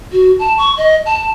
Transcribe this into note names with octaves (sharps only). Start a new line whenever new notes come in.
F#4
A5
C#6
D#5
A5